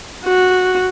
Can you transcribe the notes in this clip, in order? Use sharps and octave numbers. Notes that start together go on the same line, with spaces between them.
F#4